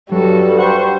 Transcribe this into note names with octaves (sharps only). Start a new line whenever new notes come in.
G2 F#3 G3 F#4 A4
C5 F#5 C#6